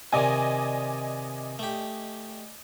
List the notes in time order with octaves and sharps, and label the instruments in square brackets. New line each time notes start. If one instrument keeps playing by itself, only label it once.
[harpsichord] C3 D#3 [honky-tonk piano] D5 D#5 G#5
[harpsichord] A3 G4